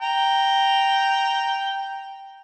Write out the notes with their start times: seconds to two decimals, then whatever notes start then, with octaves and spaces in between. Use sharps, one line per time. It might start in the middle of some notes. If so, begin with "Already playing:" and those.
0.01 G5 A#5